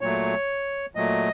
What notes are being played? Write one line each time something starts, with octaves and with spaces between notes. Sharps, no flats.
A#2 F#3 A3 C#5
A#2 F#3 A3 D#5